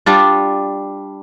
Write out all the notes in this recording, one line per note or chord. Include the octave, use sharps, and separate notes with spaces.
G3 D4 F4